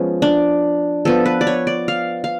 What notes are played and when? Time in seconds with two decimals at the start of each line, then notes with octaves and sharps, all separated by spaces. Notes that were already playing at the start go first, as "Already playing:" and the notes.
Already playing: F3 G#3 B3 C#4
0.22 D4
1.05 F3 B3 A4
1.26 B4
1.41 D5
1.47 C#5
1.67 D5
1.88 F5
2.24 F5